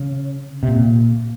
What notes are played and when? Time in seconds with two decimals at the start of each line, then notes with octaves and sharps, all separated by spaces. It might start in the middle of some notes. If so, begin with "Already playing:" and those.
Already playing: C#3
0.63 C3
0.68 A#2